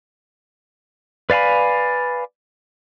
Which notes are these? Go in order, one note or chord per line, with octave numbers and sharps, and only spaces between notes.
B4 D5 F5 G#5 B5